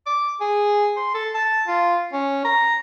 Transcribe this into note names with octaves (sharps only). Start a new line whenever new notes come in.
D6
G#4
C6
A4
A5
F4
C#4
A#5